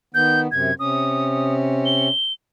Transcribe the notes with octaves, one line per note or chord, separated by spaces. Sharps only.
D#3 B3 G6
F#2 C3 G#6
C3 C#4 D#6
G7